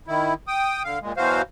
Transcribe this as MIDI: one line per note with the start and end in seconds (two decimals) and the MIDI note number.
0.08 0.34 51
0.08 0.34 64
0.48 0.83 79
0.48 0.83 87
0.84 0.99 50
0.84 0.99 77
1.02 1.12 46
1.02 1.12 56
1.17 1.42 47
1.17 1.42 52
1.17 1.42 54
1.17 1.42 66
1.17 1.42 72
1.17 1.42 77